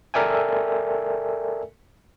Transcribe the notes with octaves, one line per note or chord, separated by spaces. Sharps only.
A4 A#4 D5 E5 G5 G#5